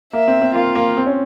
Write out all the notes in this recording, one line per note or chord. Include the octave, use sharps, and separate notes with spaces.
A#3 E5
C4
C4
A#3 F4
A#3
C4
C#4